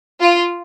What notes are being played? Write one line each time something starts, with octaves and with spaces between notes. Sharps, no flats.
F4